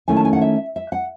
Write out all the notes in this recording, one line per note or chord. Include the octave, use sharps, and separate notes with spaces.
D#3 A3 C#4 E4 G#5
A5
G#5
F#5
E5
E5
F#5